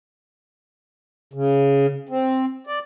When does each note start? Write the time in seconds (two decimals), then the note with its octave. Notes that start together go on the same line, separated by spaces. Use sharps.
1.34 C#3
2.09 C4
2.67 D5